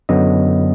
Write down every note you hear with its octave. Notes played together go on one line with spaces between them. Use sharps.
F#2 D3 F#3 B3 D#5